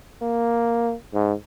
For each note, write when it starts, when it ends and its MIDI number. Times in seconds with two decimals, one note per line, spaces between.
0.22 0.94 58
1.14 1.33 44